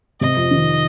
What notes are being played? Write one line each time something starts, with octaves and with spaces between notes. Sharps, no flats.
C3 D#5
F2
D#3